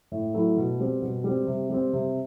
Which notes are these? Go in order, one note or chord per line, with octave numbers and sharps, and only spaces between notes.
A2
F#3 A3 E4
B2
G3 C4
B2
G3 C4
C3
G3 C4
C3